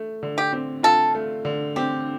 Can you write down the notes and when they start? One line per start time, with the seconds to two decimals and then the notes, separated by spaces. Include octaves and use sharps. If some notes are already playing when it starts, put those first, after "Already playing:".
Already playing: A3
0.23 D3
0.38 G4
0.53 C4
0.83 F4 A4
1.15 A3
1.45 D3
1.76 C4 G4